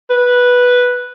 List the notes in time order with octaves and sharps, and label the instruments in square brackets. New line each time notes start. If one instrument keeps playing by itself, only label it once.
[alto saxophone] B4